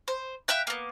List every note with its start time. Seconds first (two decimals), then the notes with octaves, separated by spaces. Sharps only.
0.08 C5
0.48 E5 F5 G5 F#6
0.67 A#3 B3